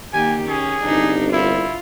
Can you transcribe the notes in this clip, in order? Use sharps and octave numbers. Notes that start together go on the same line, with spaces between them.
D#3 A#3 G4 G#5
C#4 G#4
G1 C2 D4 D#4
E4 F4